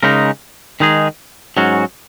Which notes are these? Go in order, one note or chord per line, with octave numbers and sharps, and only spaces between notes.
C#3 G#3 D#4 A#4
D#3 G#3 D#4 G#4
G#2 F#3 C#4 F#4